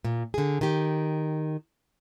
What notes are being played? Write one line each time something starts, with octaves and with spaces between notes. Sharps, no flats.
A#2
D3 G#4
D#3 G4